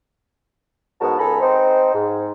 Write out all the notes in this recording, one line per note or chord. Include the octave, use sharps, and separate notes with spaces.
G#2 B3 F#4 A#4 A5
C#2 A4 G#5 A#5 B5
C4 D#4 C5
G#2